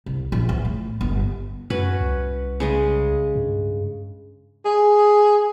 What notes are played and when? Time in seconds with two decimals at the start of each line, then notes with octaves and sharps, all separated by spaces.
0.06 C2
0.32 A#1
0.49 E2
0.65 A2
1.01 G1
1.70 F#2 C#4 F#4 B4
2.00 C2
2.60 C#3 G#3 D#5
3.36 G2
4.65 G#4